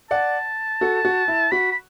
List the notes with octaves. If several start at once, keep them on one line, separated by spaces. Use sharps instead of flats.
D5 F#5 A5
F#4 A4
F#4
E4
F#4 B5
B5